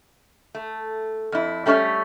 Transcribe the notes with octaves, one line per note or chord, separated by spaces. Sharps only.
A3
F2 E4
G3 A3 C#4 C#5 E5